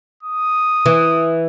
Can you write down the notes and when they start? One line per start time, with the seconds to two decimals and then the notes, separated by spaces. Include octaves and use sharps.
0.23 D#6
0.86 E3